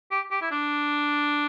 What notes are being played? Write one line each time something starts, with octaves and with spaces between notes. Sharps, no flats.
G4
G4
E4
D4